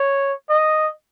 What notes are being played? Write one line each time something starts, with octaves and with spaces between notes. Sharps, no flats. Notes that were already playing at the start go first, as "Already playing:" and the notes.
Already playing: C#5
D#5